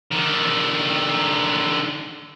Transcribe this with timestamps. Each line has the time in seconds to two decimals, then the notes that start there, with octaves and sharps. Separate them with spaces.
0.12 D3 D#3